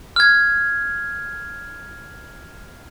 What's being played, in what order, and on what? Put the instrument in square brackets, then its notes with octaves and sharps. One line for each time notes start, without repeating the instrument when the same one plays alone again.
[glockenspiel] F6 G#6